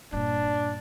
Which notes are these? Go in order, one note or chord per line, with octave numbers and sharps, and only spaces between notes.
G2 A#2 D4